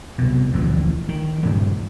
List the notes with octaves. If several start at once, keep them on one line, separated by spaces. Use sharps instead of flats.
C2 B2
A1 D2 A#2 F3
D#3
G2 A#2 C#3 G3